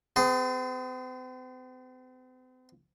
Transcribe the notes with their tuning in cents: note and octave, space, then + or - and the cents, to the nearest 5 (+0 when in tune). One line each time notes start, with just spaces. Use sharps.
C4 -45 G#4 +0